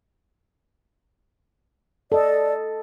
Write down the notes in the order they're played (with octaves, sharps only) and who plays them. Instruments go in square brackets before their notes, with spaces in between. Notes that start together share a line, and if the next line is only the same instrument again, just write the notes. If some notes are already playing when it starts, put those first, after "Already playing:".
[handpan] A4 D#5 [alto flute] D5